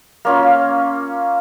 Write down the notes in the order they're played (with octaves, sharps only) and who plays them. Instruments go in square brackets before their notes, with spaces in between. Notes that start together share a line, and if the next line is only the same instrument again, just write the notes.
[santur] A#3 C#4 F4